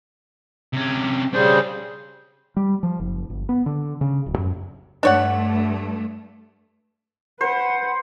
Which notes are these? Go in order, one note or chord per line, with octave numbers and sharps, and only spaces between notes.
C3 C#4
C#3 G3 D4 G#4 C5
G3
F3
F#1
G1
B3
D3
C#3
D1
F#2
G2 A3 D4 C#5 F#5
B4 C5 F#5